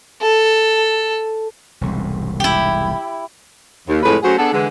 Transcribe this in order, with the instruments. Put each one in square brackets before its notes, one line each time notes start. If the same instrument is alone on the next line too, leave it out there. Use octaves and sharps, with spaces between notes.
[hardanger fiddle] A4
[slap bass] E1 C2 G#2
[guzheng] E4 G4
[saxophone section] D#2
F2 A2 G#3 G#4 B4
F#3 A3 C#4 F#4 G#4 C5
B3 D4 G#4 A4
D3 E3 G#3